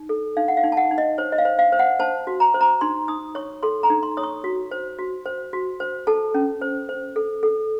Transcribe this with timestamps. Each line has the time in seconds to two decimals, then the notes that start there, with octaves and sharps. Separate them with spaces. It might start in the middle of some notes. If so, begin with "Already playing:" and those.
Already playing: D#4
0.09 A4
0.37 D#4 F5
0.48 F#5
0.57 F5
0.64 D#4
0.72 A5
0.77 F#5
0.91 D#4
0.98 D#5
1.18 C5 C#5
1.32 D#5
1.38 F5
1.45 C5
1.59 F5
1.72 C5
1.79 F#5
1.99 C5 A5
2.27 F#4
2.40 A#5
2.54 C5
2.61 A#5
2.81 D#4 C6
3.08 D#4 D#6
3.35 C#5 C#6
3.63 A4 C6
3.83 A#5
3.90 D#4
4.03 C6
4.17 C#5 D#6
4.23 C#6
4.44 F#4
4.71 C5
4.98 F#4
5.25 C5
5.53 F#4
5.80 C5
6.07 A4 A5
6.34 C#4
6.62 C5
6.89 C5
7.16 A4
7.43 A4